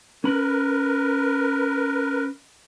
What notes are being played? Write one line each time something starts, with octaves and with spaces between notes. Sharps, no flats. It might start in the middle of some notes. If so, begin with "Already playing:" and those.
C#4 A#4 B4 B5